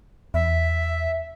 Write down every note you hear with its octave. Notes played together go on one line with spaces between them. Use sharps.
E2 E5